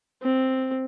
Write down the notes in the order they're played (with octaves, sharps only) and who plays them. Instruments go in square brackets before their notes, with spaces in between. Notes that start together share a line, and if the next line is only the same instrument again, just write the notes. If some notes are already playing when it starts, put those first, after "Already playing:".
[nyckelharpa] C4